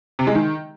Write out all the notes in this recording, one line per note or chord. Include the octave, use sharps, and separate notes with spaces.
C3
G#3
D#3